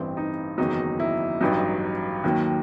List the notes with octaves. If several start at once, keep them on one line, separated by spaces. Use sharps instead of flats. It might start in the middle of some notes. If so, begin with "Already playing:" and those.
Already playing: A1 G2 E3 C4
D#4
F#1 E2 D#3 F#3 D#4
E4
A1 G2 F#3 D#4
D#2 D#3 F#3